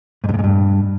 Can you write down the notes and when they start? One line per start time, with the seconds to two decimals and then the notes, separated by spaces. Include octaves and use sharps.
0.24 G#2
0.29 G2
0.34 A2
0.39 G#2
0.44 G2